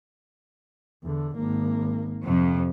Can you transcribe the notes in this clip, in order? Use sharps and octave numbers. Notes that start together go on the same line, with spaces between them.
E2 D3
G#1 A#3
F2 C3